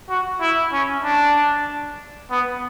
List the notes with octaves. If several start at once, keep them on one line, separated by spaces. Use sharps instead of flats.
F#4
E4
C#4
D4
B3